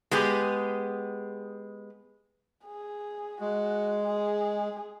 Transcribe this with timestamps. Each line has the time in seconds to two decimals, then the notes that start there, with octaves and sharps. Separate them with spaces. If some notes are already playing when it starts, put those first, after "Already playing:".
0.11 G#3 B3 G4 G#4
2.67 G#4
3.41 G#3 F#4
4.04 G#4